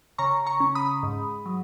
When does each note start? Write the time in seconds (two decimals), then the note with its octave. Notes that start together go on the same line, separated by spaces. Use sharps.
0.18 C#3 A#5 C#6
0.46 A#5 C#6
0.60 C#4
0.75 B5 D#6
1.03 G#2
1.46 F#3